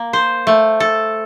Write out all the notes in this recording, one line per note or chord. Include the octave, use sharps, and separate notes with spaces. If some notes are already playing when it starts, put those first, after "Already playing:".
Already playing: A#3
C5
A3
A4